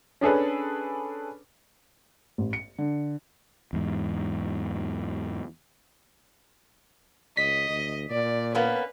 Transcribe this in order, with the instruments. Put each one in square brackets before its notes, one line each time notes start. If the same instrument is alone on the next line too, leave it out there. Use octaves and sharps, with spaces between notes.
[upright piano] C#4 D4 G#4 A4 B4
[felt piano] A1
C#7
D3
[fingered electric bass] E2 G#2
[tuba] C#2 [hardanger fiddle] D#5 [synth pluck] B6
[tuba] D2
[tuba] A#2 [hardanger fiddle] D5
[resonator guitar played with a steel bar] A#3 B3 C#4 [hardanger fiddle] B4